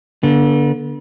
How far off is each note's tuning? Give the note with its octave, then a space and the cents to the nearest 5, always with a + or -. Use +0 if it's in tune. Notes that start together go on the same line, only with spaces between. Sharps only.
D3 -15 B3 -40